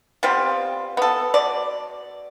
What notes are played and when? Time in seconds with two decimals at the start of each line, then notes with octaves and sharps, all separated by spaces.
0.23 G3 B3 C4 F4
0.97 B3 A4
1.34 B2 D5